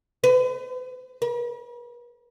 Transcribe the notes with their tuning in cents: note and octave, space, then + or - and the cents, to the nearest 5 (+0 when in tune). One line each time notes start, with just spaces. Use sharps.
B4 +45
B4 -45